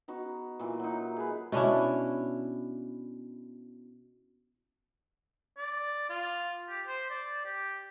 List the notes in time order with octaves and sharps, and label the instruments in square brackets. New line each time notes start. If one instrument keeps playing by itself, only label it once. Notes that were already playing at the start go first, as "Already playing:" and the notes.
[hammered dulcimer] B3 D#4 F#4
A#2 E3
F#3 D#4
G#4 B4
[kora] B2 C#4 D4 E4
[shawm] D5
F4
G4
C5
D5
G4